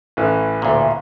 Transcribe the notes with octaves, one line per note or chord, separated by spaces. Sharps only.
A1 E3
D2 A#2